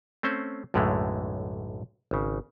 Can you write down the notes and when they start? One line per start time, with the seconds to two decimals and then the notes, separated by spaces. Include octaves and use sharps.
0.23 A3 C4 C#4 C5
0.74 B1 F#2 A2 D3 G#3 A3
2.11 G#1 C#3